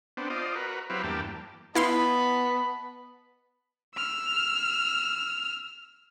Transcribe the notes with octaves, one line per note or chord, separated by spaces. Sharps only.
B3 C4 D4
F4 C5 D5 D#5
F#4 A#4 B4
F#3 C4 E4 G4 B4 F5
E2 G2 A#3 G4 A5
B3 E4 D#5 F5 A5 B5 C6
E6 F6